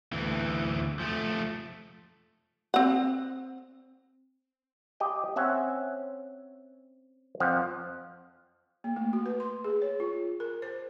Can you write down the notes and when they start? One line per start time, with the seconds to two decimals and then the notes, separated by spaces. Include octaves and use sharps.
0.13 D2 E3
1.00 F3 A3
2.74 C4 F#5
5.00 G4 D#5 G5
5.36 C4 C#4 E5 F#5
7.40 F2 F3 F#5
8.84 A#3
8.96 A3
9.13 F#4
9.26 B4
9.40 C6
9.64 G#4
9.82 C#5
10.00 F4
10.40 A#4
10.62 C5